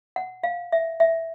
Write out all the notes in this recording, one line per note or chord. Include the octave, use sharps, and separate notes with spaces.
F#5
F5
E5
E5